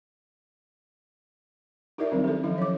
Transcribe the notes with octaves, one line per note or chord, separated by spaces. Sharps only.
D#4 E4 G4 A#4 D5 E5
D#3 F#3 G3 C4 C#4
G4 A4
D#3 F3 F#3 C#4 E4
C#5 D6